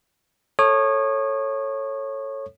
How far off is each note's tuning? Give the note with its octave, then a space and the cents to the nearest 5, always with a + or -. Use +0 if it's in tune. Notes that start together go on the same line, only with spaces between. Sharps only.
A4 +5 C#5 -15 D#6 -40